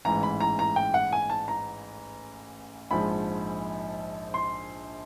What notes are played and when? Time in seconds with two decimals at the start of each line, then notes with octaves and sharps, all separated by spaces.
0.05 A1 G#2 E3 A#5
0.23 B5
0.40 A#5
0.59 A#5
0.76 G5
0.94 F#5
1.12 G#5
1.30 A5
1.48 A#5
2.91 A#1 G#2 F3 G#3 B5
4.34 C6